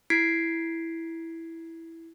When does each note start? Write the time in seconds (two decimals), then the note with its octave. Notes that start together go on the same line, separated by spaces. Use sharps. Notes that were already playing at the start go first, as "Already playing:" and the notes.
0.10 E4 G#6 B6 C7 D7